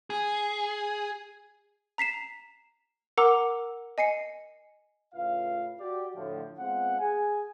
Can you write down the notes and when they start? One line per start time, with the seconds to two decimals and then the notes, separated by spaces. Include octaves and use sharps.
0.10 G#4
1.98 A#5 B6 C7 E7
3.18 A#4 F#5 A#5 D6 E6
3.98 D#5 G#5 C7 C#7
5.15 A2 C#3 F4 B4 F5
5.80 F#4 G4 D5
6.16 A2 D3 F3
6.59 G#3 B3 C4 F4 F#5
7.00 G#4 G#5